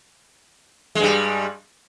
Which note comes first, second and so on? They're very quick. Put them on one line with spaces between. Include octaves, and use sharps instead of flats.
G#3 G2 G3